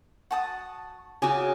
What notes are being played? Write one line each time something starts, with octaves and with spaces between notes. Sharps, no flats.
F#4 A5 D#6
C#3 F#4 G#5 D6 D#6